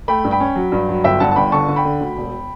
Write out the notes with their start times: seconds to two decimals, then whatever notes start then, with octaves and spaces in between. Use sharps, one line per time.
0.08 A3 G5 B5
0.24 G2
0.31 G5 B5
0.40 C#4
0.56 F#3
0.72 G2
0.89 F#3
1.04 G1 E5 G5
1.20 G2 F#5 A5
1.31 A5
1.36 G1 G5 B5
1.52 D3 A5 C#6
1.68 D3
1.76 G5 B5
1.85 D3
2.00 D2
2.17 E1